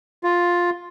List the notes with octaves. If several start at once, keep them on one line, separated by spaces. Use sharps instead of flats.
F4